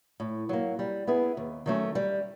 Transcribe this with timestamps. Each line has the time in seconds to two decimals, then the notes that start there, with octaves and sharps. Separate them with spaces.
0.20 A2
0.49 F#3 A#3
0.79 G3
1.07 B3 E4 G#4
1.37 D#2
1.66 D#3 F#3 A3 C#4
1.95 G3